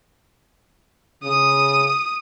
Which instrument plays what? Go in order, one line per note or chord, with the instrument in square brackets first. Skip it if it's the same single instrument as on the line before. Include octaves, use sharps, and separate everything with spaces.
[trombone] C#3 [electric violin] D#6